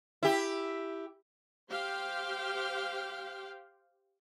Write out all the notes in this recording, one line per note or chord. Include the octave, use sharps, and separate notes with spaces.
E4 G4
G4 C5 F5 G5